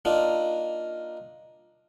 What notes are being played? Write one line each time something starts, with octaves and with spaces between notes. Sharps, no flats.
A#3 D4 D#4 F4